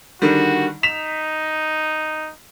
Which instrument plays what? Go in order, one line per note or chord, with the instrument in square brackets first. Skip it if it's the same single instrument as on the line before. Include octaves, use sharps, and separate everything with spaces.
[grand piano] D3 D#3 G3 [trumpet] F#4
[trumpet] D#4 [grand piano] B6 E7 F7